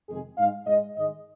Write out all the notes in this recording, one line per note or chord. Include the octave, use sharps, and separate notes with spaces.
F2 C3 D#3 G#3 G#4
G#2 G#3 F5
G#2 G#3 D#5
G#2 D#3 G#3 D#5